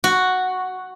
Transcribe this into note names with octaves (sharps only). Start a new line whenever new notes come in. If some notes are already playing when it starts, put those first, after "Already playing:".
F#4